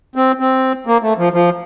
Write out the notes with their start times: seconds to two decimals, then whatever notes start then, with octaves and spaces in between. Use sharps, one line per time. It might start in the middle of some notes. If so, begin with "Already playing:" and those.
0.16 C4
0.40 C4
0.87 A#3
1.02 A3
1.18 F3
1.33 F3